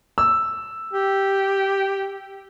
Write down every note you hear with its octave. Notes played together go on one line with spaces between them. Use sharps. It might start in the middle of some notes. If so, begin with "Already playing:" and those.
E6
G4